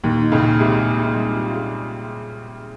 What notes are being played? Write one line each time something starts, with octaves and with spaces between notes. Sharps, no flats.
D#2 A#2 D#3
D#4
C#2 C#3
A#2
C2 C3 G#3
A#2
D#4
G3
F4
G#4